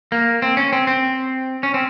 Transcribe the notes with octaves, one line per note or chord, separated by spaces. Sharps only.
A#3
C4
C#4
C4
C4
C#4
C4